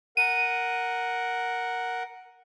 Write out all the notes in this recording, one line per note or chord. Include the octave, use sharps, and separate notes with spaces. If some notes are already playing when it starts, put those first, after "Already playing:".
A#4 F#5 D#7